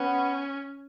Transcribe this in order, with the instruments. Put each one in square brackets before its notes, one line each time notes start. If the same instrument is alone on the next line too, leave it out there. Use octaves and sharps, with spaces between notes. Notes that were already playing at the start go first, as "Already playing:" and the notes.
Already playing: [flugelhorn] B3 [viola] C#4